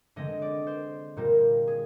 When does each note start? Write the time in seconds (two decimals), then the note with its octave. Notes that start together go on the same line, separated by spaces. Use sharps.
0.16 D3 G#3 C4 D#5
0.42 D5
0.67 C5
1.17 A#2 G3 C4 A#4
1.67 G#4